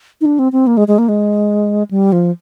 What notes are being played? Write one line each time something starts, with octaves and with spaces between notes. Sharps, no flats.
D#4
D4
C4
C4
A#3
G#3
G#3
A#3
G#3
G3
F3